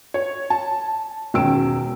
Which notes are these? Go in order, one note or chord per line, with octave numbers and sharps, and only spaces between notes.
C#5
A5
E1 D#3 C#4 E6 D7